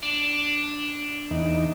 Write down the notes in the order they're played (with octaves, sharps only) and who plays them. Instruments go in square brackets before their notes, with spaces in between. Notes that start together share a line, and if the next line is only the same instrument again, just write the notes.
[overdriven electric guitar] D4
[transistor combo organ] E2 D#4